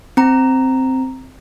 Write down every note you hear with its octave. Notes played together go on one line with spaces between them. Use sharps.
C4 A#5